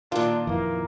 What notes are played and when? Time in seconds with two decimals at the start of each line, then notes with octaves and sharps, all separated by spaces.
0.12 A#2 D#3 D4 F4
0.47 F2 E3 A#3